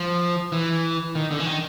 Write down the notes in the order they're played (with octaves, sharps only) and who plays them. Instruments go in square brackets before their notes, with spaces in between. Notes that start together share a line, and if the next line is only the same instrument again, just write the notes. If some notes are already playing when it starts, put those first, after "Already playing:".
Already playing: [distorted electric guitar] F3
E3
D#3
D3
E3
D#3